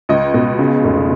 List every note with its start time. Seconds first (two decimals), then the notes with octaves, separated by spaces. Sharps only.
0.09 C#2 D#5
0.34 B2
0.59 C#3
0.84 F1